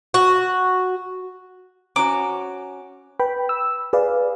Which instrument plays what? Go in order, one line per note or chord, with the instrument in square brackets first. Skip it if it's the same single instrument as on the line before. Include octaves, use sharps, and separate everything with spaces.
[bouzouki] F#4
[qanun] C#4 F#4 [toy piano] C5 A#5 [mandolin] D6
[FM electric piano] B4 G5 B5
E6
G#4 B4 D5 F5